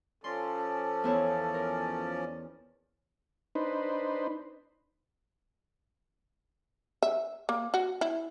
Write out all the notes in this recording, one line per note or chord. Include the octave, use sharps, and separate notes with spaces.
F3 C#4 A4 D5 C6
E2 E4 C#5
A#4
D4 D#4 B4 C5
E5
A#3
F#4
E4